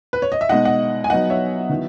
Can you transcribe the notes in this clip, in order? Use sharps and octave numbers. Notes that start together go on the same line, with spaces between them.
B4
C#5
D#5
E5
B2 G#3 D#4 D#5 F#5
D#5 F#5
G#5
F#3 B3 D#4 D#5 F#5
C#5 E5
D#3 F#3 B3 E4